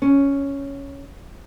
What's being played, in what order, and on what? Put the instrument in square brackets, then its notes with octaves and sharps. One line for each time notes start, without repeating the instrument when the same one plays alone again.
[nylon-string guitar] C#4